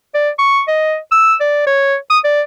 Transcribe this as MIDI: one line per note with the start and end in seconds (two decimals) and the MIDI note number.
0.15 0.30 74
0.39 0.62 85
0.68 0.97 75
1.12 1.35 88
1.40 1.65 74
1.67 1.97 73
2.10 2.19 87
2.25 2.42 74